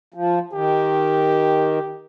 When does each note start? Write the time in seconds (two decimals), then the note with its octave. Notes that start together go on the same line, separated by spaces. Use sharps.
0.14 F3
0.53 D#3 G4